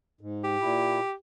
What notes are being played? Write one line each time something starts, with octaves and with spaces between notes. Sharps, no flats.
G#2
G4
A#2 E4